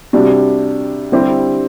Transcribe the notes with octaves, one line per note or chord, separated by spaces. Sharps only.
C3 G3 D4 F#4
D3 G3 C4 E4 G4